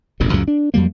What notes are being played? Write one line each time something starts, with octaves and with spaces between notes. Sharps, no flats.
E1 A1 F#2 A2
C#2 F#2 A#2 C#3
D4
F2 F#3 G3 A#3